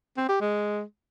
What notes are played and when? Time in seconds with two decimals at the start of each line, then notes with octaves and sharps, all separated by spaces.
0.17 C4
0.29 G4
0.41 G#3